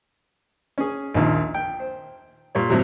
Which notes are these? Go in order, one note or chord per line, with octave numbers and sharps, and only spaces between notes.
C#4 G#4
A#1 D#2 A#2 D#3
G5
C5
A#2 G3 C#5
A2 C3 F#3 G3